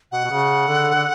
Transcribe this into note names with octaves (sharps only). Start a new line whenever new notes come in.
B2 F#5
B2
C#3
D3
D3